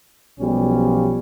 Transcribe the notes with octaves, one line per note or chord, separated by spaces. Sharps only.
B1 B2 F3 G3 C#4